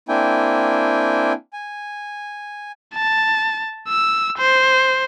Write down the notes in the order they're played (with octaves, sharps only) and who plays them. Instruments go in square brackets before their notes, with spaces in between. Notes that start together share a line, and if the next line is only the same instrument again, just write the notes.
[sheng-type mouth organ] A#3 C4 D4 E4 G5 G#5
G#5
[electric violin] A5
E6
C5